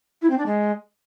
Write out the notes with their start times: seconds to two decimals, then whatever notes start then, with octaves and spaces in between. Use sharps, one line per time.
0.22 E4
0.30 C4
0.38 D4
0.46 G#3